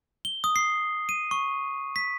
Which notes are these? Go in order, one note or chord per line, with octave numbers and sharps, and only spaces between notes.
G7
D#6
C7
D#7
C#6
B6